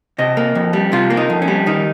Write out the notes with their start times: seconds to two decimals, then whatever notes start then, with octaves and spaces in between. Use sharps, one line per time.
0.18 C3 D#5
0.37 A#3
0.55 F2
0.73 G3
0.92 C3 F4
1.10 A#3
1.17 D#4
1.30 F2
1.42 C#4
1.48 G3
1.66 D#3 D#4